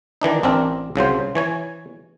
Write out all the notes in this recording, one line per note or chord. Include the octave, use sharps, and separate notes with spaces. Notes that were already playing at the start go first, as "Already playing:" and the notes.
D#3 E3 D4 D#4
A1 C4 D4 A#4
C2 C#3 F#3 C5
E3 C#5 G#5